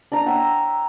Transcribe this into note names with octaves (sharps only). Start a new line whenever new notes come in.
D4 A#5
C#5 E5 F#5 G5